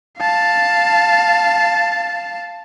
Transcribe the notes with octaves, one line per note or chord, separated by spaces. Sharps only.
F5 A5